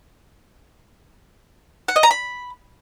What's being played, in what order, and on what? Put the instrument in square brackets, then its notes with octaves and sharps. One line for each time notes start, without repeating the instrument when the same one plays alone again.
[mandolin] F#5
D#5
A#5
B5